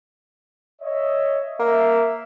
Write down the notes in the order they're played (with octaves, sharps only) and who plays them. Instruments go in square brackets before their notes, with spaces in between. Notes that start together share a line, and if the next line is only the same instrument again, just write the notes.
[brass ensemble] C#5 D#5 E5
[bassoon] A#3 [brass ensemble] E5